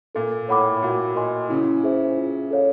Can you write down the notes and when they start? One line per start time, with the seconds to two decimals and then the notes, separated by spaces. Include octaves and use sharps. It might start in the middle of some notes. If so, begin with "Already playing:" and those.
0.15 A#2 A4
0.48 A2 C#5 F#5 B5 D6
0.82 A#2 F#4
1.16 A#4 D#5 G#5 C6
1.49 C#3 E4
1.84 G#4 C5 E5
2.18 F4
2.51 A4 C#5 F5